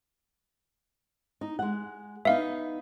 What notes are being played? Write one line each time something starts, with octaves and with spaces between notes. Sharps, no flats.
D#4
G#3 F#5
B3 D#4 E5 F5